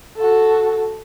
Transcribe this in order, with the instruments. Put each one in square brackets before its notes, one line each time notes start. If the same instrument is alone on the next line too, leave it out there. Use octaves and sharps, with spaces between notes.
[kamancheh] F#4 A4